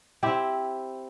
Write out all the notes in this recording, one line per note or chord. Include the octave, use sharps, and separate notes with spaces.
C4 E4 G4